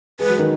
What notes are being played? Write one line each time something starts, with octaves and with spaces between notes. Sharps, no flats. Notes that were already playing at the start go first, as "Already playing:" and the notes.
G#3 G#4 B4
F#3 F#4
D#3 D#4